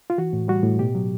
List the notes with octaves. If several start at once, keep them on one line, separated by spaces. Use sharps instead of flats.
F4
E3 F#4
A2
G3 F#4
A2
B2 G4
F#3